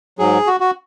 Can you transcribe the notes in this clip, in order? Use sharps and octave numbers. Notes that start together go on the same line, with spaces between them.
G#2 F#3 G#4
F#4
F#4